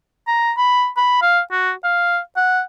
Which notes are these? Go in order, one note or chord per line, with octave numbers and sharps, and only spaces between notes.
A#5
B5
B5
F5
F#4
F5
F#5